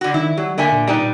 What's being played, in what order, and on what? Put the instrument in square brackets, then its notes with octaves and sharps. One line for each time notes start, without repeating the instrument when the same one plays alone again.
[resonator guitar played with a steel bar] D3 F#4
[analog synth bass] D#3 [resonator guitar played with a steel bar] E4
[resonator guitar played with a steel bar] F#3 [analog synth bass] G3
[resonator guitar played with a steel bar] D3 E5 G#5 [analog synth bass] A#3
[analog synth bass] A#2
[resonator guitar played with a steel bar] G3 D#4 B4